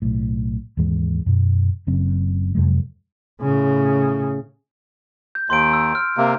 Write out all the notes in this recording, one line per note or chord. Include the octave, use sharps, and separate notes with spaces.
B1 A2
D#2 G#2 E3 G#3
F#2 B2
F#1 F#2 C#3 C4
F2 C3 F#3 G#3
A2 C#3
G6
D#2 C6 G6 D7
E6
F6
C3 A#3